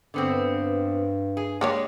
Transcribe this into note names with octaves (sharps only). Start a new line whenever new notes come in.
G2 D3 B3 C4
G#4
G#3 A#3 D4 G4 C#5